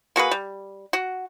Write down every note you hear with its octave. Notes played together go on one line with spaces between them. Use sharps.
A#3 F#4 G#4 B4
G3
F#4